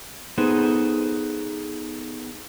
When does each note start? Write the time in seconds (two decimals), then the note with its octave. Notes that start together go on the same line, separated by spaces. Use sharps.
0.38 B3 D#4 G#4 A4 B4 C5